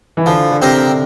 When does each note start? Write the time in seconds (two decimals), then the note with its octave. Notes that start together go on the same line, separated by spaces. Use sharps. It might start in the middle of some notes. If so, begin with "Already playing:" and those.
0.17 E3
0.26 D3 F3
0.51 D3
0.62 C3 C4 G4 A#4
0.87 D3